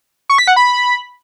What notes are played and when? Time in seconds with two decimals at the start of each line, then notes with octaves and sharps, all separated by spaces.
0.30 C#6
0.38 B6
0.47 F#5
0.56 B5